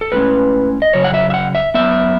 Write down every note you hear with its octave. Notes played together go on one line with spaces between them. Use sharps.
A4
A2 G#3 C#4 B4
D#5
F#2 C#3 F#3 C#5
F#5
E5
E5
F#5
E5
F#2 E3 B3 E5